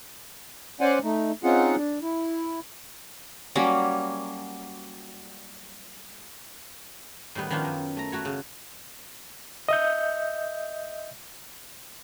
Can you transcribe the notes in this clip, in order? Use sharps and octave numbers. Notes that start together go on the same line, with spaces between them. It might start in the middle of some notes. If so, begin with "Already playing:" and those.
C#4 C5 D5 F#5 G#5
A3 D#4
C4 C#4 D#4 F4 G#4 F#5
D4
E4
F#3 G3 A#3 C#4
A2 D#3 G3 B3
D#3 F3 C#4 D4 F4
F#2 D#3
A3 A#5
A3 F#4 C#5
C#3
D#5 E5 G6